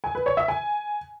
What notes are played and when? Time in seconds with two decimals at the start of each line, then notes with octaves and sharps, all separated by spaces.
0.04 G#5
0.15 B4
0.26 C#5
0.37 E5
0.48 G#5